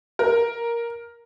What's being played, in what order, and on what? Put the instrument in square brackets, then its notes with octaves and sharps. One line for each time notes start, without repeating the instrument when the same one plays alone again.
[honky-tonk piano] A#4